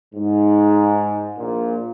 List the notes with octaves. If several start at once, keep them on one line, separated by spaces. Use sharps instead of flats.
G#2
A#1 A#2